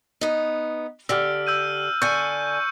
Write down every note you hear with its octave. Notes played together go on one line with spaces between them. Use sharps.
B3 D#4
D3 G4 E6 F6
E6 G6 D#7
D3 G#5 C#6 G6 C#7